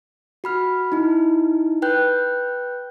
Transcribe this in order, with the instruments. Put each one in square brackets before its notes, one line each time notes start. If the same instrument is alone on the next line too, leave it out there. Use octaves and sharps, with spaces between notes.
[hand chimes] F#4 B5 F6
D#4 E4
B4 G5 F#6 G6